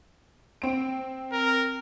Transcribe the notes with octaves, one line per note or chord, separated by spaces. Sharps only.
C4 D7
A#4